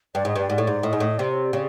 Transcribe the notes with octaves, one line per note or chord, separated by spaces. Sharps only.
G2 D5
G#2 D#5
G2 D5
G#2
A2
G#2
A2 D#5
G#2
A2
C3 D5
C#5
D5
C#3